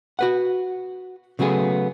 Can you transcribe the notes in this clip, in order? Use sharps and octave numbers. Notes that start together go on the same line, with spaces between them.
F#4 B4 F#5
C#3 F#3 A3 B3 G#4